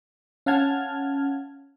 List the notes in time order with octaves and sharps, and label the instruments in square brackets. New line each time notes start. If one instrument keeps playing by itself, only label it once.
[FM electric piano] C#4 F5 F#5 A5 F6 G#6